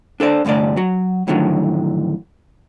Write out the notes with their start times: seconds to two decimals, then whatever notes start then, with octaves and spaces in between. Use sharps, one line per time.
0.20 D4 A4 C5 D5
0.45 C2 G2 D3 A3 D5
0.76 F#3 F#4
1.27 F2 A2 D3 D#3 F#3